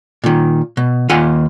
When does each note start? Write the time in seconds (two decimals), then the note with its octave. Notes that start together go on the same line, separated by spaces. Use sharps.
0.24 A#2 D#3
0.77 B2
1.09 D#2 F4 F#5 G#5